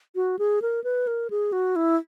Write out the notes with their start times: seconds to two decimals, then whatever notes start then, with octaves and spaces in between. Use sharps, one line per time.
0.15 F#4
0.39 G#4
0.62 A#4
0.84 B4
1.07 A#4
1.30 G#4
1.52 F#4
1.76 E4